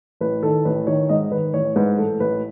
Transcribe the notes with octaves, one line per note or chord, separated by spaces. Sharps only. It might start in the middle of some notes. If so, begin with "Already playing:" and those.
A1 B4
D#3 A4
A1 B4
D#3 C#5
G#2 D#5
D#3 B4
A1 C#5
G#2 B4
A1 A4
A1 B4